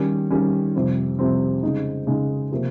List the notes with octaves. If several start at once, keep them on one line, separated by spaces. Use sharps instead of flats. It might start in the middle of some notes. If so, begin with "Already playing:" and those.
Already playing: D#3 G3 C#4
D#3 G3 C#4
F2 C3 G3 C4
F2 C3 G3 C4
C#3 G#3 D#4
C#3 G#3 D#4
C3 F3 A#3